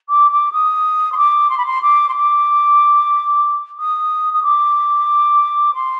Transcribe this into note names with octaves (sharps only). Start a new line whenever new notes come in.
D6
D6
D#6
C6
D6
C6
B5
C6
D6
C6
D6
D#6
D#6
D6
C6